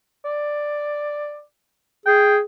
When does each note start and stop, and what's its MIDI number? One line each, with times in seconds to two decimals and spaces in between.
0.25 1.41 74
2.06 2.41 68
2.06 2.36 79